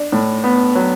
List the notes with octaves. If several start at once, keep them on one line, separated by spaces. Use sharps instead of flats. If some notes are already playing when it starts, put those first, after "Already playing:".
Already playing: D4
A2
B3
F#3